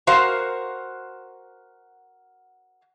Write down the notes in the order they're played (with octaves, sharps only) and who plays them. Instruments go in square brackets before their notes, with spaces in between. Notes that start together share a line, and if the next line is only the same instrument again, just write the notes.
[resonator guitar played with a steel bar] F#4 A#4 C5 F5